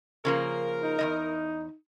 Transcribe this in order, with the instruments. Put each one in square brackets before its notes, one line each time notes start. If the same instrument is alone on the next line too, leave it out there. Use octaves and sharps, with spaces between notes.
[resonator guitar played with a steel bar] C#3 F3 A#3 [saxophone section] A#4
[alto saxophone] D#4
[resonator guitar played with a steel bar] E2 G3 D#5